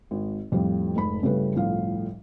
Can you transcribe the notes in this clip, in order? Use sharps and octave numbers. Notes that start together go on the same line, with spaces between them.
G#1
F2 A2 F3 G3
F1 G#2 B5
G1 C#3 G3 A3 A4 B4
G1 C2 A2 F3 F5